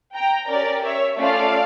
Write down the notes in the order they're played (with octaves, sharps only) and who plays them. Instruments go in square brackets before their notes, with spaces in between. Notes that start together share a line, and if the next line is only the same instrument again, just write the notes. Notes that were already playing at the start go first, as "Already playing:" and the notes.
[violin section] G5 A#5
C#4 G4 A#4 D5
C#5 E5
A3 C#4 F4 A4 D5 F5